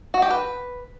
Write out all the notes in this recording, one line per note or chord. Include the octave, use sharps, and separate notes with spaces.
F#4
G4
B4